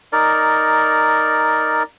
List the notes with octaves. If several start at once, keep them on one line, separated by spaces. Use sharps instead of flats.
D#4 A#4 D5